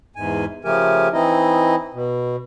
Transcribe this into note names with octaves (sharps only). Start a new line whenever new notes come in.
E2 G#2 G#5
C#3 F3 A3 G4 A#4 G#5
E3 C4 D#4 E4 D#5
B2